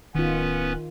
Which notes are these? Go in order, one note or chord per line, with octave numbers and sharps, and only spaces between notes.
D1 D#3 B3 C#4 F4 B4